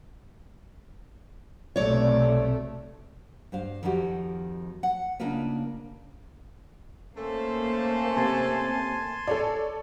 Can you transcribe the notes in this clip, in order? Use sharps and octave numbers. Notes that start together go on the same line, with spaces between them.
B1 C3 A3 C#5 D5
G2 C5 F5
F2 D#3 F3 D#4 F#4 G4
F#5
C#3 A#3 D4 D#4 F4 B4
A3 A#3 C#4 A4 C5
C3 G#5 A5 C6
A4 C#5 D5